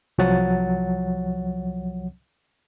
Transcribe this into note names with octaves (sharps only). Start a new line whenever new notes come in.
C2 F3 F#3 C#5 F#5 A6